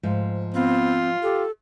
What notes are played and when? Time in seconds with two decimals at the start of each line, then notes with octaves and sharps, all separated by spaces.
0.03 G#2 F3 A3
0.54 B3 C4 F4
1.23 G4 A4